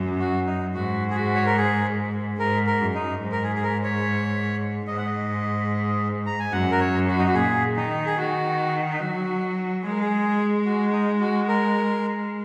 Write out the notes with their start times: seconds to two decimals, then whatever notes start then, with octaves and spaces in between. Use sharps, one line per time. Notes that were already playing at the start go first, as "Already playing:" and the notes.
Already playing: F#2
0.20 F#4
0.47 D#4
0.75 G#2 F#4
1.10 G#4
1.15 F#4
1.35 C#5
1.46 A#4
1.57 G#4
2.39 G#2 A#4
2.67 A#4
2.80 F#2
2.95 D#4
3.22 G#2
3.32 A#4
3.43 G#4
3.55 G#4
3.63 A#4
3.83 C#5
4.87 G#2 D#5
4.97 F#5
5.06 D#5
6.26 A#5
6.39 G#5
6.52 F#2 F#5
6.71 A#4
6.80 C#5
7.08 F#4
7.19 D#4
7.27 F#4
7.34 A#2 G#4
7.76 D#3 D#4
8.06 G#4
8.18 D#3 F#4
8.90 D#4
9.00 F#3 F#4
9.82 G#3 G#4
9.91 A#4
10.01 G#4
10.65 F#4
10.92 D#4
11.21 F#4
11.48 A#4